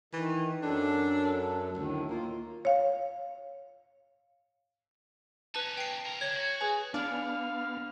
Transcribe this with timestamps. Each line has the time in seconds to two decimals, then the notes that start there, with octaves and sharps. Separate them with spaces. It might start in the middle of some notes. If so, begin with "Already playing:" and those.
0.13 D#3 E3
0.63 F#2 F#3 D4 A4
1.77 D2 A2 D#3
2.10 A#3 F4
2.65 C#5 F5
5.55 C#4 D#4 B4 A5
5.77 G5 C7
6.06 B1 A#4
6.21 D3 C#5 G#6
6.36 F#4
6.61 G#4 B4 G#5
6.94 D3 B3 D4 F5 F6